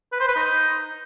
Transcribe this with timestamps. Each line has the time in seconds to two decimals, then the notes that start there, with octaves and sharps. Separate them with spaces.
0.12 B4
0.20 C5
0.28 B4
0.36 D#4